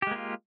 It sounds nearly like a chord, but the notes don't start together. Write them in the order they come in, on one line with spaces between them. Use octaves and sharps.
G4 G#3 A#3 F4